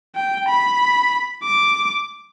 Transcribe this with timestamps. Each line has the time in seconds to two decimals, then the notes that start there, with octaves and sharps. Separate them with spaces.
0.15 G5
0.48 B5
1.44 D6